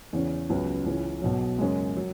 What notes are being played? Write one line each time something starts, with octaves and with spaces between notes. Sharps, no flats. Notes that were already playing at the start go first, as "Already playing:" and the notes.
E2 C#3 E3 C#4
C#2 C#3 F#3 B3
C#2 C#3 E3 C#4
B1 B2 F#3
F#2 C#3 G#3
F#3